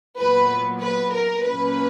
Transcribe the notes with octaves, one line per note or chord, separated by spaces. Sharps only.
A#2 F#3 B3 B4
B4
A#4
A#2 F#3 A#3 C#4 B4